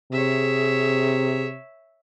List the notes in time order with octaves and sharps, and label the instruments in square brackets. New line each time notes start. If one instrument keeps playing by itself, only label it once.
[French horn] C3 [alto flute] G#4 [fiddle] C#5 E5